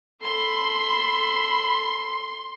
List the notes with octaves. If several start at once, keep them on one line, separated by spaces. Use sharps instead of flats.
A4 B5 C6